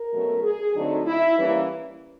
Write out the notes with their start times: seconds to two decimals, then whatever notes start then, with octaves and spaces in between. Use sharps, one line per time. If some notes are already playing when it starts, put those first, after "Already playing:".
Already playing: A#4
0.11 B2 F#3 A3 C#4
0.42 G#4
0.75 D3 F#3 A3 C4 D#4
1.06 E4
1.38 E3 G3 A#3 C#4